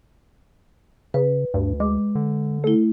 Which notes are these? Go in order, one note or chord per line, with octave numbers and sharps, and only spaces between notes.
C#3 B4
D2 G2
G#3 D6
D3
A3 E4 A4